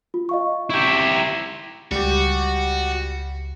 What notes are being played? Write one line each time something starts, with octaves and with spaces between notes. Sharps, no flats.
F4
D#5 F5 C#6
E4 G4 C#6 G6
C7
C#2 G3 F#4 G4